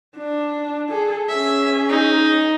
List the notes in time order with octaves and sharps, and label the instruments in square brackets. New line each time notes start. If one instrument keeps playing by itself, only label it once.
[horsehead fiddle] D4
G#4 A4
[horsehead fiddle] C#4 G#4 [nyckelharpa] E5
[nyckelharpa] D#4